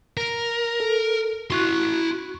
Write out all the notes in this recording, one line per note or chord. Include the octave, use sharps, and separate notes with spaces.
A#4
A4
E4 F#4 C6 C#6 F#6